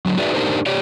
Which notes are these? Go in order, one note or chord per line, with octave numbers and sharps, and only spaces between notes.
D3 F#3
D#4 F#4 G#4 B4 D5 E5
D4 D#4 G4 A#4 C5
G4 C#5 D5